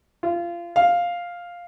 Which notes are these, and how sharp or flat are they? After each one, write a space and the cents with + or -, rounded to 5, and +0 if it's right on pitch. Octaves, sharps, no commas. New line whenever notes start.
F4 -25
F5 +5